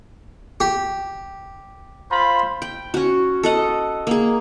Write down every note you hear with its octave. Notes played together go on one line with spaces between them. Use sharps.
G4
F4 C5 B5
G5
C#4 F#4
A4 D#5 F#5
A#3 G#4